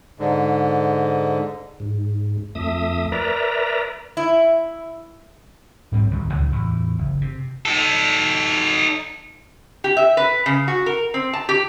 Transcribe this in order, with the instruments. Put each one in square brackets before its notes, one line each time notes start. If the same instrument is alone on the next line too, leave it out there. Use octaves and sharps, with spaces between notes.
[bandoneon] G#2 D3
[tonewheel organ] G#2
F2 A3 E5 D#6
A#4 B4 D5 E5 A#5
[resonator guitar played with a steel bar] E4
[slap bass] G#2 G3 C4
D1 C2 F2 D#3
C#2 F#2 A#2
E2 A2
F#1
C3
[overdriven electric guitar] D#4 A4
[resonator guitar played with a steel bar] G4
E5
B4
C#3
F#4
A#4
C4
A5
G4